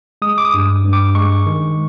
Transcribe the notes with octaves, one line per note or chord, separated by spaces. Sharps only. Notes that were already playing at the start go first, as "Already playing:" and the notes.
G#3 D#6
D6
D#6
G2
G2
D6
G#3 C#6
D#3